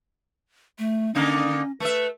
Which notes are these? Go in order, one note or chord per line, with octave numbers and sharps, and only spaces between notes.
A3
D3 A#3 C#4 D#4
A3 B4 E5